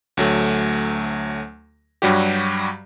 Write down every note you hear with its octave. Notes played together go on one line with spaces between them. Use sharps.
D2 F#3 A3
G2 F#3 G3 F#4 G4